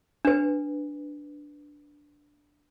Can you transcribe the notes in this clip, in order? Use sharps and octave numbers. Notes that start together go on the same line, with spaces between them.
D4 B4